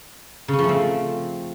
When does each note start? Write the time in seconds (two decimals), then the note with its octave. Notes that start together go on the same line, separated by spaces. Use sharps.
0.48 C#3
0.53 C#4
0.59 F3
0.64 A3
0.69 C4